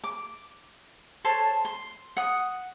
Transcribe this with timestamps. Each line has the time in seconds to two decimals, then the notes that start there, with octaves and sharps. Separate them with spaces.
0.04 D6
1.25 A4 C5 C#5 A5
1.65 C6
2.17 F#5 D#6